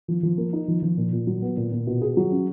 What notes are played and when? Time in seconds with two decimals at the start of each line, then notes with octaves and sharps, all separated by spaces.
0.08 F3
0.23 F3
0.38 A#3
0.53 D#4
0.68 F3
0.82 F3
0.97 A#2
1.13 A#2
1.27 F#3
1.42 B3
1.57 A#2
1.72 A#2
1.87 B2
2.02 G#4
2.17 F#3
2.32 C#4